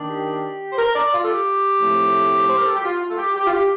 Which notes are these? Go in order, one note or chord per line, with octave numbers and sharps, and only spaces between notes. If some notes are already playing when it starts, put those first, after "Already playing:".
Already playing: D#3 A#3 D4
G4
C5
A#4
D5
F4
A4
G4
A2 F3 A3 C4
C5
A#4
A4
G4
F4
F4
A4
G4
G4
F4
G4